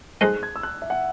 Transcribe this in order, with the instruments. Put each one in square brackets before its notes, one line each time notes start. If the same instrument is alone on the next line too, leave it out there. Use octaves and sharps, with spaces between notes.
[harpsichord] G#3 D#4 A4 C5 [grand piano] F#6
[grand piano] G#6
E6
F#6
E5
F#5